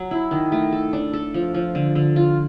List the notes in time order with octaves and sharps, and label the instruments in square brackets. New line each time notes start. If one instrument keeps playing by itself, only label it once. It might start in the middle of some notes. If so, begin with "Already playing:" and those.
Already playing: [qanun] F#3
E4
D#3
A3
A4
D4
A4
F3
F3
D3
D3
F4